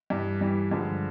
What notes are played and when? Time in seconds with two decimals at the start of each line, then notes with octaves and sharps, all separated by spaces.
0.10 G2 E3 G3
0.41 G2 E3 G3
0.71 G2 D3 F3 G#3